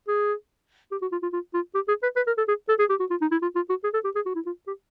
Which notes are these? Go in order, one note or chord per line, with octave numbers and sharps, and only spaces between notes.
G#4
G4
F#4
F4
F4
F4
F4
G4
G#4
B4
B4
A#4
A4
G#4
A4
G#4
G4
F#4
F4
D#4
E4
F4
F4
F#4
G#4
A4
G4
G#4
F#4
E4
F4
G4